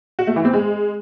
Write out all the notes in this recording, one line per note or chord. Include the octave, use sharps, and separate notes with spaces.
F#4
A3
E3
C4
G#3